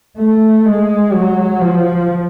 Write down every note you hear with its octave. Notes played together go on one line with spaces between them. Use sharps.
A3
G#3
F#3
F3